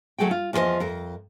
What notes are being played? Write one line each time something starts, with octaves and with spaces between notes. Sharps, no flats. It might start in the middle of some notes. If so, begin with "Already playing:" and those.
D2 F#3 A3 G#4 G5
F4
E2 F3 D4 A#4 C5 D#5
F2 A#4